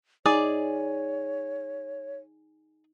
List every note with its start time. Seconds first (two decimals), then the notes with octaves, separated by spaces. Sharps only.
0.26 D#4 G#4 C#5 D5